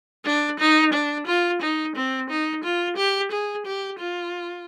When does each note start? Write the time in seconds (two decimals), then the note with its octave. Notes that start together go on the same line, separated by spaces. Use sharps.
0.25 D4
0.60 D#4
0.93 D4
1.27 F4
1.62 D#4
1.96 C4
2.30 D#4
2.64 F4
2.97 G4
3.31 G#4
3.66 G4
4.00 F4